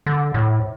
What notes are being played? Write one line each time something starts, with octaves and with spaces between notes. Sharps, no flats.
D3
A2